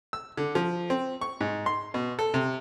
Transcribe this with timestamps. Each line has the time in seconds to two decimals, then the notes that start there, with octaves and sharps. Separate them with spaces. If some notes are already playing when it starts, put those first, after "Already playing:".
0.13 E6
0.37 D3
0.55 F3
0.90 C4
1.21 C#6
1.41 G#2
1.66 C6
1.94 B2
2.19 A4
2.34 C3